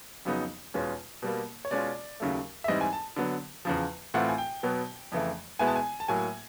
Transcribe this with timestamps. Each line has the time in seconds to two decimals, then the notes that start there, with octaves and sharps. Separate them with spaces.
0.25 F2 C#3 F#3 B3 D#4
0.74 E2 B2 G#3 C#4 F4
1.22 B2 G3 A#3
1.65 C#5
1.71 B2 G#3 C#4 F4 D5
2.20 D#2 C#3 F#3 A3
2.64 E5
2.68 G#2 E3 G3 C4 E4 D#5
2.81 G#5
2.93 A5
3.16 D3 F#3 B3
3.65 E2 C#3 F3
4.14 A2 E3 A3 C4 F4 F#5
4.29 G#5
4.38 G5
4.63 B2 F#3 B3
5.12 F2 C#3 E3 A3
5.59 B2 G#3 B3 E4 G#5
5.67 A5
5.76 G#5
6.00 A5
6.08 A2 F#3 A#3 G#5